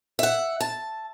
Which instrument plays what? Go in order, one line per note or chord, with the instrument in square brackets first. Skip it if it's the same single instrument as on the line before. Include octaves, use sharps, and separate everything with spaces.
[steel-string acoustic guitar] E5 F#5
A5